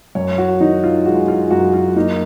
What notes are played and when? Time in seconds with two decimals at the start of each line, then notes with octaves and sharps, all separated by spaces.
0.15 F#2 C#5
0.38 F#4
0.61 D#3 D#4
0.84 F4
1.06 G#3 F#4
1.28 F4
1.50 F#2 F#4
1.74 F4
1.96 A#3 D#4